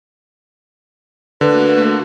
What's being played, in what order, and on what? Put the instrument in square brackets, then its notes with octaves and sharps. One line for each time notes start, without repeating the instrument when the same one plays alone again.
[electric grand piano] D3 [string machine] A3 A#3 F#4 [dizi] B4